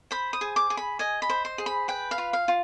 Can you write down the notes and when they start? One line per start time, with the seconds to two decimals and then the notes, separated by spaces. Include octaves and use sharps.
0.11 C5 B5
0.33 D#6
0.41 G#4
0.56 D6
0.70 G#4
0.77 B5
0.99 D#5 G#5
1.22 B5
1.29 C5
1.45 C6
1.58 G#4
1.66 B5
1.88 B4 G5
2.11 F5
2.18 F4
2.33 F5
2.48 F4